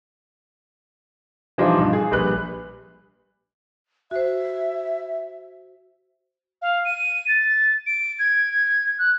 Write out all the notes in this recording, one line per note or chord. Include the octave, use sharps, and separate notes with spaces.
E3 F3 G3 D4 D#4 F4
G2
G#4
A#1 G3 B4 F#6
F#4 C5 E5
F5
D#7
A6
D7
G#6
F#6